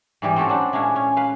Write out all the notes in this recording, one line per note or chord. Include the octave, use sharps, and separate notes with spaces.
G#2 E3 G3 G4 D#5
C4 C#4 F#4 G4 A4
F#3 D4 D#4
A#2 G#3 C#4 D4 E4
C#4
B4 F5